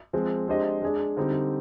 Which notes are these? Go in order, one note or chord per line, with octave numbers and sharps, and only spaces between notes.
F3 G#3 C4
G#3 D4 G4 C5 D#5
G#3 D4 G#4 D5
D3 G3 C4 D#4 G4